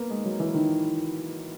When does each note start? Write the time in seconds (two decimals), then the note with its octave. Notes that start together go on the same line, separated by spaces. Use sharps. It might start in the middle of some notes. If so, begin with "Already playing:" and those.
Already playing: A#3 B3
0.10 G#3
0.25 F#3
0.40 E3
0.54 D#3